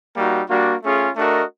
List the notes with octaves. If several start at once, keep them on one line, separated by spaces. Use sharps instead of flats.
G3 A#3 D#4 F#4
G3 A#3 D4 F#4
A3 C#4 F4 G#4
A3 D4 F#4 A#4 D#5